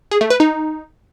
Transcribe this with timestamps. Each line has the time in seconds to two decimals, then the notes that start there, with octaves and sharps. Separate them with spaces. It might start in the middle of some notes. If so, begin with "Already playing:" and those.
0.11 G#4
0.21 A3
0.30 B4
0.40 D#4